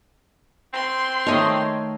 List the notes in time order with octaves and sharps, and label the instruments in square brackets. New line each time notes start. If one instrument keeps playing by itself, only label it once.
[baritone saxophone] C4 [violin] C6
[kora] D#3 A3 [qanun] C#5 D#5